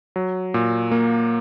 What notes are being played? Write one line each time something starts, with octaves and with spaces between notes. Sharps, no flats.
F#3
A#2
A#3